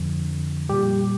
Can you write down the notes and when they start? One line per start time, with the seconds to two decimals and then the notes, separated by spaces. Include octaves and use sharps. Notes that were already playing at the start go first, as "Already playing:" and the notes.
Already playing: F2 D3 F3
0.69 A#2 G3 G4